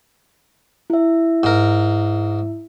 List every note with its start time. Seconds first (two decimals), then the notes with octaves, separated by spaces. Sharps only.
0.90 E4 E5
1.43 G#2 A#4